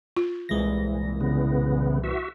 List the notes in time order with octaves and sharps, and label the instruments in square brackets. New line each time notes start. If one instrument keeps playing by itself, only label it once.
[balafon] F4
[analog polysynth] C2 A#2 E3 [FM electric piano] G#3 A#6
[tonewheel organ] C#3 B3
F#4 E5